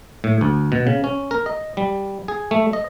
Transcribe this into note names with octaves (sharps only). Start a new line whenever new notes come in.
A2
D2
B2
C#3
C#4
A#4
D#5
G3
G#4
A3
D#5